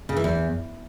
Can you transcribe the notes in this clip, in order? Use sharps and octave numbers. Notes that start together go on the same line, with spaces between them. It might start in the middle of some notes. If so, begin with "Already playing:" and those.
C#3
E3
E2